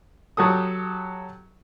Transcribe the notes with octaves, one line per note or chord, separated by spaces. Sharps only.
F#3 G4 A4 D#6